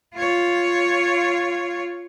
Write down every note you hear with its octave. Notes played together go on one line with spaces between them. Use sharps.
F4 C#5